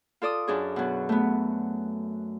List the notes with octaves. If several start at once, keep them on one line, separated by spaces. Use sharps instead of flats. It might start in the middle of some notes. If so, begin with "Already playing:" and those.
F4 A4 D5 D#6
F#2 D4 G#4
B2 F#3
A3 B3